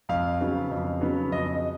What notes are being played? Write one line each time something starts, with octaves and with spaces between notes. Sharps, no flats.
F2 F5
C#3 F#3 B3
F2
C#3 F#3 B3
F2 D#5